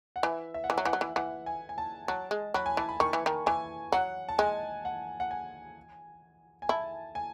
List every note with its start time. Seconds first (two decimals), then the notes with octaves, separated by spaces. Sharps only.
0.16 F#5
0.23 E3 E5
0.54 E5
0.64 F#5
0.70 E3
0.74 F#3 E5
0.85 E3 F#5
0.93 F#3
1.01 E3
1.16 E3 F#5
1.46 G#5
1.69 G#5
1.78 A5
2.08 F#3 A5
2.31 G#3
2.54 F#3 B5
2.66 G#5
2.77 E3 A5
2.89 B5
3.00 D#3 C#6
3.13 E3
3.26 D#3
3.46 E3 G#5
3.92 F#3 F#5
4.29 A5
4.38 G#3 G#5
4.85 F#5
5.20 F#5
5.31 G#5
6.62 G#5
6.69 E4 A5
7.15 G#5